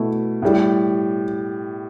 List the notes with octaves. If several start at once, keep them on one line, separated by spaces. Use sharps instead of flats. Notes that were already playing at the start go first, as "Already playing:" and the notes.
Already playing: B2 A3 E4
A2 G3